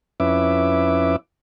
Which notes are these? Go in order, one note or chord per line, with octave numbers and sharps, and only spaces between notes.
F2 C#4 E4 B4 E5 D6